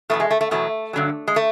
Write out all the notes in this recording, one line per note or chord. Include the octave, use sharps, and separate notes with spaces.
E2 B2 F#3 A3
G#3
A3
A3
E2 B2 F#3 A3
G2 D3 F#3
G#3
A3